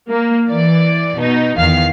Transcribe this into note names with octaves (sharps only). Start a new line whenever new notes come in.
A#3
E3 D5
B2 D#4
E2 D#3 F5 F6 C7